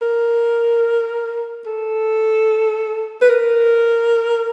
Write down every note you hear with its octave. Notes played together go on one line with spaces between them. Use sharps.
A#4
A4
B4
A#4